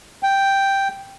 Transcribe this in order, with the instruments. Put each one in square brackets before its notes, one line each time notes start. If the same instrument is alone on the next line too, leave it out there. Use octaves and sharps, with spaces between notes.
[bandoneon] G5